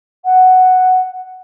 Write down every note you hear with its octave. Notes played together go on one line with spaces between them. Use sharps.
F#5